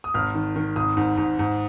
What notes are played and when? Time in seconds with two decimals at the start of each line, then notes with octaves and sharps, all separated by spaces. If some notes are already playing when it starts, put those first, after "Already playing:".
0.04 D#6
0.14 G#1 F6
0.35 D#3
0.56 D#3
0.76 G#1 D#6
0.97 G#2
1.17 G#2
1.39 G#2